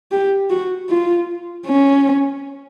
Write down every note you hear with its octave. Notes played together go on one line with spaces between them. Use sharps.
G4
F#4
F4
C#4